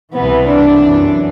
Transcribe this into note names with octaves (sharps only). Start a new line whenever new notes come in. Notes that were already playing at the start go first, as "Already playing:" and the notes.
C2 C3 E3 B3
D4
F#2 E3